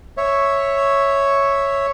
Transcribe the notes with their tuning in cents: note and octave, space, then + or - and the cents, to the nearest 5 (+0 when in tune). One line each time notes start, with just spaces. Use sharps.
C#5 +0 E5 +0